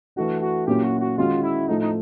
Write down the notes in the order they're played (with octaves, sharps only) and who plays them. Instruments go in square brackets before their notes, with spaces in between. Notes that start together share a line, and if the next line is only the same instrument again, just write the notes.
[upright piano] E3 A3 D4 [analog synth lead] F#4
[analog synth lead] F#4
[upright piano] A#2 F#3 A#3 C#4 E4 [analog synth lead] G4
[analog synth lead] F#4
F#4
[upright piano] D#3 G#3 C#4 F#4 [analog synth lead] F4
[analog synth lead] E4
[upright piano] A2 F3 A3 [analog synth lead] D#4
[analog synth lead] D#4